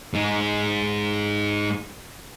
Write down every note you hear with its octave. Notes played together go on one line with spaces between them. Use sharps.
G#2 G#3